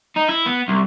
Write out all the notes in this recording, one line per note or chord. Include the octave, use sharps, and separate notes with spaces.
D#4
E4
B3
C2